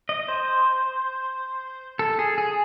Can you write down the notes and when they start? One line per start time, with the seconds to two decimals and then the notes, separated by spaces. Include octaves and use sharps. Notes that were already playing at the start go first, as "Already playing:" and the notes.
0.09 D#5
0.28 C5
1.99 A4
2.19 G#4
2.38 G#4